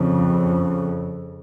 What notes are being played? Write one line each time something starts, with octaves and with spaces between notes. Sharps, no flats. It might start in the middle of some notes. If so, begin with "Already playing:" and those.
Already playing: F2 C#3